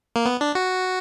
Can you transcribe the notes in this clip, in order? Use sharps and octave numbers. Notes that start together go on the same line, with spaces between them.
A#3
B3
D4
F#4